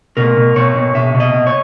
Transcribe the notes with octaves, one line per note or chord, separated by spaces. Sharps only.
B2 A#4
B2
B2 C#5
B2
B2 E5
B2
D#5
B2
C#5